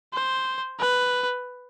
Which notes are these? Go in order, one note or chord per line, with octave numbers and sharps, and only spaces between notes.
C5
B4